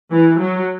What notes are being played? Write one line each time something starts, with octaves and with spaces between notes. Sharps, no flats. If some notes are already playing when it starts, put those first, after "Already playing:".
E3
F#3